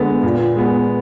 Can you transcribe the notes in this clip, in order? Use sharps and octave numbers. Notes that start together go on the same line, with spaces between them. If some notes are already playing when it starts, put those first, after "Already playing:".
Already playing: D3 G#3 B3
A#2
G#3 B3